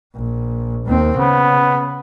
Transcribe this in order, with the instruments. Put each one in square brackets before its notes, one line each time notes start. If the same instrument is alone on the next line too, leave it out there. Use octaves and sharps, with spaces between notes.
[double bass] A#1
D#2 C4
[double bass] C#3 [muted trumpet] B3